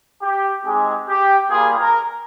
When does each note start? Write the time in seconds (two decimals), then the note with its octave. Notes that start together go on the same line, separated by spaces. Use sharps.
0.23 G4
0.65 G#3 C4 D#4 G4 G#4
1.08 G4
1.50 G3 A#3 F4 G#4
1.79 A#4